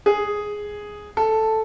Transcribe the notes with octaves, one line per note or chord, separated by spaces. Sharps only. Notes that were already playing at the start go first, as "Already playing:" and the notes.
G#4
A4